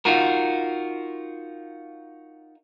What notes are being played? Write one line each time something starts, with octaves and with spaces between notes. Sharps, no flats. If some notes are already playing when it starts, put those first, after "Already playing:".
D#4 F4 F#4 A#4